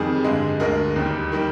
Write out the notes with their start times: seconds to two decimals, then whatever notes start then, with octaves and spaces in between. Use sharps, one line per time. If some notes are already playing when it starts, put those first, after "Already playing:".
Already playing: F2 D#3 G3 G#4
0.24 G2 D3 G#3
0.60 D2 D3 G#3 A#4
0.96 D#2 D#3 G3
1.32 D#3 G3 A#4